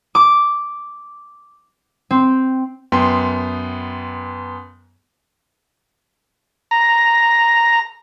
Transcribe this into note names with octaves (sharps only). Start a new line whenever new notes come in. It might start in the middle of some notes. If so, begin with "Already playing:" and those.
D6
C4
F#2 B3 G5 C6
A#5